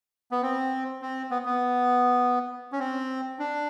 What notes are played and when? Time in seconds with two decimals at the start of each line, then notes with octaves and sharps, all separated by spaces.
0.31 B3
0.42 C4
1.02 C4
1.31 B3
1.45 B3
2.72 C#4
2.79 C4
3.39 D4